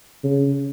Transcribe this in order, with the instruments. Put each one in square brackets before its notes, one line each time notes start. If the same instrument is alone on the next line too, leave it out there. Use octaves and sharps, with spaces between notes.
[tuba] C#3